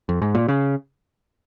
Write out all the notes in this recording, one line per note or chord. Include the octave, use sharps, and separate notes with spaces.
F2
G#2
A#2
C#3